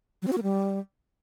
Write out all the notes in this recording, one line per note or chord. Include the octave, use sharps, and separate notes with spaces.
F#3
C4
F#4
A#3
G3